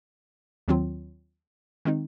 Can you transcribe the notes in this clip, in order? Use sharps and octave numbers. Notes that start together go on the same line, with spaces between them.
D#2 D#3 F#3 C4 F4
D#3 G#3 C4 D#4